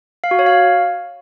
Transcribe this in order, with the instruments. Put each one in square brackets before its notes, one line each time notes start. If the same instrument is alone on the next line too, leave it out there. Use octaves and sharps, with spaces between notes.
[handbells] F5
F#4
C#5
F5